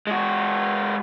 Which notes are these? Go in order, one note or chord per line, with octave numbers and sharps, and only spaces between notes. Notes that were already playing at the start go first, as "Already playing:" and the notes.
G#3 F#4